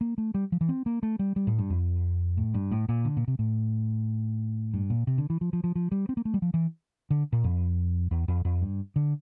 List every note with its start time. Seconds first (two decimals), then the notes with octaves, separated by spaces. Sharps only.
0.01 A#3
0.18 A3
0.34 G3
0.52 F3
0.61 E3
0.69 C4
0.86 A#3
1.03 A3
1.19 G3
1.36 G3
1.47 A2
1.59 G2
1.70 F2
2.37 A2
2.54 G2
2.71 A2
2.89 A#2
3.05 D3
3.17 A#2
3.28 C3
3.39 A2
4.74 G2
4.90 A#2
5.07 C3
5.18 D3
5.30 E3
5.41 F3
5.53 F3
5.64 F3
5.75 F3
5.92 G3
6.09 C4
6.17 A#3
6.25 A3
6.34 G3
6.42 F3
6.54 E3
7.10 D3
7.33 A#2
7.44 F2
8.11 E2
8.28 F2
8.45 F2
8.62 G2
8.96 D3